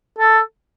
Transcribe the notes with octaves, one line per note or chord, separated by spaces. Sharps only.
A4